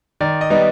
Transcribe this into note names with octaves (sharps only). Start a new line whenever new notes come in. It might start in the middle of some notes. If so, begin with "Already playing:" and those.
D#3 D5
D#5
G3 B3 D#4